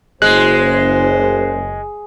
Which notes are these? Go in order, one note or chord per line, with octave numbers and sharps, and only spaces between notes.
F#1 G#3 C5 F#6